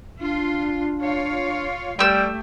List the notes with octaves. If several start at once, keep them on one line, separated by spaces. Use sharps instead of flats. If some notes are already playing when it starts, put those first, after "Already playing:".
D4 F4
F4 C#5 F5
G3 A3 G4 E6